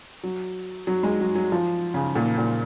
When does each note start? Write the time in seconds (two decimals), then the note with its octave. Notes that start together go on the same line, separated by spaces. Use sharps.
0.23 F#3
0.87 F#3
1.03 G#3
1.20 F#3
1.35 F#3
1.52 F3
1.94 C#3
2.15 A#2
2.38 A#2